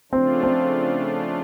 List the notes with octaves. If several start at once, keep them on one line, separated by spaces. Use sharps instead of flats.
C#3 F3 A3 C4 D4 F4
C4